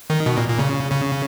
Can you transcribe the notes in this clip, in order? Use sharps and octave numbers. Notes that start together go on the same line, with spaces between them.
D#3
B2
A#2
A#2
C#3
C#3